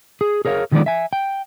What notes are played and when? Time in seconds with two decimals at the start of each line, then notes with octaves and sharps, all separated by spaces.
0.21 G#4
0.45 G#4 A#4 C#5 F5
0.72 D3 D#3 F3 G#3 B3 D5
0.86 E5 G#5
1.13 G5